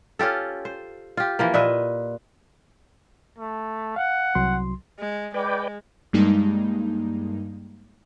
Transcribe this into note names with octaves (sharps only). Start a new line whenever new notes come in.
C#4 F4 G4 A4
C5
F4 G4
E3 F3 A#3
A#2 B4 D#5 E5
A3
F5 F#5
C2 F#3 C6
G#3
G#3 B4 D5 G5
G2 G3 G#3 A#3 D#4